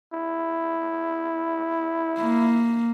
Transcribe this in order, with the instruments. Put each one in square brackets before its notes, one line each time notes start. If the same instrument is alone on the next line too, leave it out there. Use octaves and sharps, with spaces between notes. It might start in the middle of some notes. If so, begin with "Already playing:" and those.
[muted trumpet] E4
[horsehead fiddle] A#3